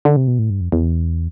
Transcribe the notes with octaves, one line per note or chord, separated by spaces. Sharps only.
D3
C3
B2
A2
G2
F2
E2